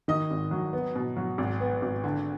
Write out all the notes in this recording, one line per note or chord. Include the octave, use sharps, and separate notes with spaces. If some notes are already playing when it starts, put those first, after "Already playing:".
D#3 D#5
G#1
F#3
B3
B2
F#3
G#1
B3
G#1
D3